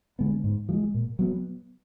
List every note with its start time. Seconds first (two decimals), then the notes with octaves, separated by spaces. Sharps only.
0.19 D3 G#3 B3
0.44 G#2
0.69 F3
0.73 G#3
0.94 A#2
1.19 F#3 B3